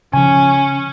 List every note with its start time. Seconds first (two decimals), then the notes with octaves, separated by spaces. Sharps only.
0.13 C#3 F3 C#4 G#5